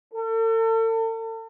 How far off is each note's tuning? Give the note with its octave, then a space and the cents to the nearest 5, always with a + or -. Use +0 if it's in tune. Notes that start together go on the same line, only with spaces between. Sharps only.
A4 +40